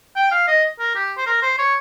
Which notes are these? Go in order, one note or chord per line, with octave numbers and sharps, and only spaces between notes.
G5
F5
D#5
A#4
G4
C5
A#4
C5
C#5